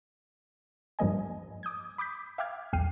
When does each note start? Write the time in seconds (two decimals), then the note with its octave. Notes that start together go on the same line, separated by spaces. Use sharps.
0.99 G2 F3 G3 A#3 D#5 G#5
1.63 D6 D#6 G6 G#6
1.98 B5 D6 D#6 G6 B6
2.38 E5 F5 G5 D6 F6 G#6
2.73 B1 E2 G5 F6 C7 D#7